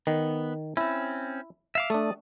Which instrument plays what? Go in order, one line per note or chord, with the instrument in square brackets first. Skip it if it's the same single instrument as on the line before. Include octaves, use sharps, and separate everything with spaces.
[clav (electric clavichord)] D#3 [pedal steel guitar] B3
[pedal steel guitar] C4 C#4 [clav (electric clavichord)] E4
[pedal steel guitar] E5 F5 D6
[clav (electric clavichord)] A3 D4 [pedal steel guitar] D5 D#6